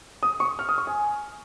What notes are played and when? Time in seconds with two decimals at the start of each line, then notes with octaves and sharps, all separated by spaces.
0.23 D#6
0.40 C#6
0.59 F6
0.69 D#6
0.78 C#6
0.87 G#5